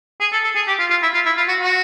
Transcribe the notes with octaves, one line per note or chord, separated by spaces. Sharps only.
G#4
A4
A4
G#4
G4
F4
F4
E4
F4
E4
F4
F#4
F#4